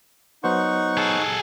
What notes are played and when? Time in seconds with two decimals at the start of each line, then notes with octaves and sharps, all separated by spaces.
0.44 F#3 B3 D#4 C5 F#5 C#6
0.98 G#4 A4